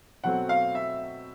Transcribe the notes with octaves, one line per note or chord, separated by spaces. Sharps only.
B2 F#3 A3 C4 F#5
F5
E5